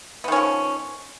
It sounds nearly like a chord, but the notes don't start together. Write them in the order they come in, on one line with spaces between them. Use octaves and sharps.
B3 D#3 C#4 F3